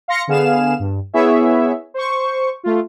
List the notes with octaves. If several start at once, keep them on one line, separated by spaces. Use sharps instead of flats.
F5 C6 A#6 C#7
D3 B3 G#4 F5 F6 E7
G2
B3 E4 G#4 C#5 E5
C5 C#6
A3 F4